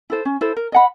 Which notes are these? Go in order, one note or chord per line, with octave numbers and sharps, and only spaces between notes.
E4 A4 C5
C#4
E4 A4 C5
A#4
D#5 F#5 B5